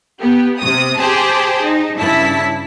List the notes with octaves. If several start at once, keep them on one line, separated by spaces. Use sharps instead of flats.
B3 G4
C3 D#6
G4 G#4 C5 G5 A5
D#4
G2 C#3 E4 A5 B6